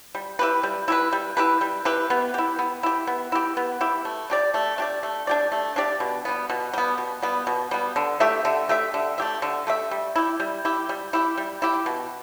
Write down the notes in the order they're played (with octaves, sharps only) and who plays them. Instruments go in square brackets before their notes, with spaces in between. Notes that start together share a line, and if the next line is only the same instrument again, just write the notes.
[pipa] G3
E4 G4 B4
G3
E4 G4 B4
G3
E4 G4 B4
G3
E4 G4 B4
B3
E4 G4
B3
E4 G4
B3
E4 G4
B3
E4 G4
A3
D4 G4 D5
A3
D4 G4 D5
A3
D4 G4 D5
A3
D4 G4 D5
B2
G3 B3
B2
G3 B3
B2
G3 B3
B2
G3 B3
D3
A3 G4 E5
D3
A3 G4 E5
D3
A3 G4 E5
D3
A3 G4 E5
G3
E4 G4
G3
E4 G4
G3
E4 G4
G3
E4 G4
B2